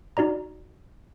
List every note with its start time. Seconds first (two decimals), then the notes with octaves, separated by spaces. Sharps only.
0.17 D#4 F#4 D5 A#5